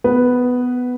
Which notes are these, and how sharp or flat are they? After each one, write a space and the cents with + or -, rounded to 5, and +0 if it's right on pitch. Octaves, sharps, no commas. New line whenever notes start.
B3 +10 B4 +0